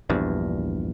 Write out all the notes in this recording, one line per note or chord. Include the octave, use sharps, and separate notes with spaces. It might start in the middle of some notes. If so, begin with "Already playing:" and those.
A#1 E2 G2